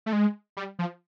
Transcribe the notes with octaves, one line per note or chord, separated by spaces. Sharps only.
A3
G#3
G3
F3